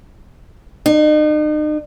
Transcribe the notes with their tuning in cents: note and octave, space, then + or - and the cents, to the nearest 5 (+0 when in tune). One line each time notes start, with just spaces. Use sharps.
D#4 -40